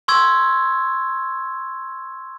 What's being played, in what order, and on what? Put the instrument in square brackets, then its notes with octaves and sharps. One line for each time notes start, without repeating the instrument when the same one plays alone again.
[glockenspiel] C6 C#6 E6 G#6